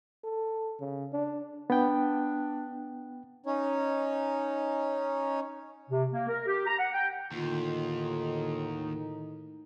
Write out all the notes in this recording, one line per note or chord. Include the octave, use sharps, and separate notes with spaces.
A4
C#3
D4
B3 D4 G5
C#4 D#4 C#5
C3
A#3
A#4
G4
A#5
F#5
G5
D#2 A2 D3 D#3 D#4 F4